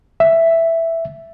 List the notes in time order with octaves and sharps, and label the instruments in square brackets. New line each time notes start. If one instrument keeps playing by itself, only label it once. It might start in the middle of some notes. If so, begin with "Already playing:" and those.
[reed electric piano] E5